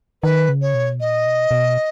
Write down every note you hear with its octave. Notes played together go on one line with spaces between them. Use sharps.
D#3 B4
C#3
C#5
B2
A#2 D#5
B2
B2